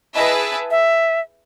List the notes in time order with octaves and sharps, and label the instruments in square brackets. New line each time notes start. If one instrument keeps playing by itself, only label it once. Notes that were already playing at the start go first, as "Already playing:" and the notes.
[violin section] E4 G#4 B4 E5 A5 [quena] D#5
[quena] E5